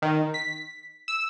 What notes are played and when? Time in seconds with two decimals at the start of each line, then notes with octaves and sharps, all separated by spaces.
0.02 D#3
0.34 B6
1.08 E6